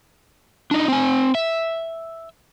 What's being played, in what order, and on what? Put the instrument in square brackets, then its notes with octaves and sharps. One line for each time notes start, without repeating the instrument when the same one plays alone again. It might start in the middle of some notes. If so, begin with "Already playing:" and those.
[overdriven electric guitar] D4 D#4
C4 G#5
E5